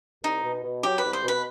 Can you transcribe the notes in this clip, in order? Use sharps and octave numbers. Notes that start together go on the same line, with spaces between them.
C2 D#4
B2
B2
F#3 G4
B4
C2
C5
B2
B4